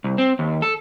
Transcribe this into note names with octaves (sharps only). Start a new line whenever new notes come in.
C2
C4
D#2
A4